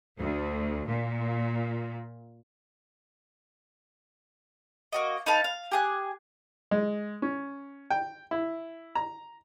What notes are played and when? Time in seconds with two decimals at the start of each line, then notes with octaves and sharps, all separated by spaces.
0.19 D2
0.88 A#2
4.92 A#3 F#4 D#5
5.26 D#4 B4 F5 A5
5.44 F5
5.72 G4 G#4 F#6
6.71 G#3
7.22 C#4
7.90 G5
8.31 E4
8.95 A#5